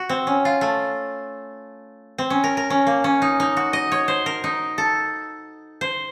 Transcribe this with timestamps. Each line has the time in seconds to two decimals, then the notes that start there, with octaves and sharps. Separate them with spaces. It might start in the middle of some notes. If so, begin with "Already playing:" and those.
Already playing: F#4
0.09 C4
0.27 C#4
0.45 F4
0.61 A3
2.18 C4
2.30 C#4
2.44 A#4
2.57 A#4
2.70 C#4
2.87 A#3
3.04 C#4
3.22 D#4
3.40 D#4
3.57 F#4
3.73 D#5
3.92 C#5
4.08 C5
4.26 A#4
4.44 D#4
4.78 A4
5.81 C5